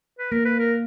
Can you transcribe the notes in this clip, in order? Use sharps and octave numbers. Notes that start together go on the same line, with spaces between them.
B4
A#3 A#4
B4
A#4